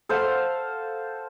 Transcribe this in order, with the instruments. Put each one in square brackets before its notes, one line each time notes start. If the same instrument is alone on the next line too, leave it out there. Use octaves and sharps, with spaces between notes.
[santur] A4 C5 F5 F#5